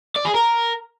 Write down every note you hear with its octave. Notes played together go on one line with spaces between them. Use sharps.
D5
G#4
A#4